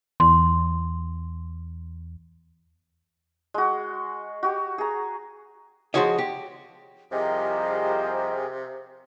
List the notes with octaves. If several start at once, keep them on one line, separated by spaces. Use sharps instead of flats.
E2 C6
G#3 F#4
F#4 G4
G#4 A#5
F3 F#3 G#3 F#4 C#5 D#5
G4
C2 C3 F3 G4 G#4 A#4 C5 D#5